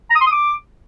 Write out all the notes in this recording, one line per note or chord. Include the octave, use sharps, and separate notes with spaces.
A#5
D#6
C6
D#6
D6